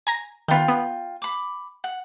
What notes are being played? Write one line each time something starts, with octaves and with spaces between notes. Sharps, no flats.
G#5 A#5 A#6
D#3 B3 F4 G5
B3
B5 D6
F#5